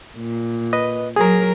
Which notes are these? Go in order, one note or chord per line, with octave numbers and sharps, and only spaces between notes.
A#2
B4 D#5
F#3 G#4 A#4 A#5